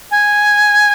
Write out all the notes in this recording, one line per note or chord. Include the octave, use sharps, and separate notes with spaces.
G#5